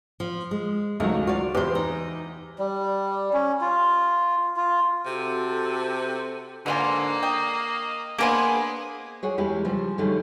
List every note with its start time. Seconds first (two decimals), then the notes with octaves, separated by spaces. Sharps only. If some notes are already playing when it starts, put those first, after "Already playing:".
0.20 F3
0.51 G#3
1.00 C#2 D#3 F#3 G#3 A3
1.27 F4 F#4 D5 F5
1.55 E2 G4 B4 C5
1.75 D#4
2.59 G3
3.33 C#4
3.61 F4
4.56 F4
5.05 C3 F#4 A4
6.66 G#2 B2 D3 A#3 F4 G#5
7.23 D#5 G5
8.19 A#3 B3 D4 G#4 A#4 C5 G#5
9.23 F4 F#4 G#4 C#5
9.38 E2 G3 G#3 E4 G4
9.64 C#3 F3 G3
9.98 D3 D#3 F#3 G3 A3 G#4